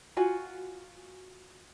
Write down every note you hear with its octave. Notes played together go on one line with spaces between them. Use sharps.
F4 F#4 G#5